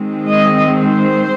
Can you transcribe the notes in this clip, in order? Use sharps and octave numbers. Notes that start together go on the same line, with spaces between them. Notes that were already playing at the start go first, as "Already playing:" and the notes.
Already playing: D#3 G#3 C4
D#5
C5